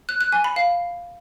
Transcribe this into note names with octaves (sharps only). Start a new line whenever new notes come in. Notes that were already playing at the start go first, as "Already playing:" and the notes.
F#6
F#6
G#5
B5
F5